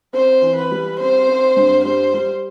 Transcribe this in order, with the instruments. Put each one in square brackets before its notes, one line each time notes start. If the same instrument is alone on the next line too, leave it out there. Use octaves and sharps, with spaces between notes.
[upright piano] C4 [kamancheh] C5
[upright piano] E3
[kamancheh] B4
[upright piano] G3
[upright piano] C4 [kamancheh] C5
[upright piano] C4
G2
[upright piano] G3 [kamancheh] C5
[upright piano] G3